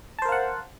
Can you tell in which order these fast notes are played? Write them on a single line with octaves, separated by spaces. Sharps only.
A5 C5 A#4 F5 F#5